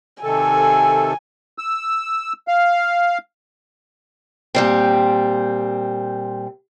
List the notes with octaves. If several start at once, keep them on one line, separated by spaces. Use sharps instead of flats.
C3 D#3 A4 G#5
E6
F5
A#2 G3 C4